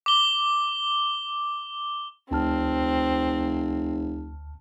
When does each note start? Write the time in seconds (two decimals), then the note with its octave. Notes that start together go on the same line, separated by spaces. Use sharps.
0.06 D6 G7
2.31 F1 D2 C4 A5 F6